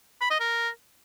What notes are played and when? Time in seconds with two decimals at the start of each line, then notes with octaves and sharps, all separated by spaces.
0.21 B5
0.30 D#5
0.40 A#4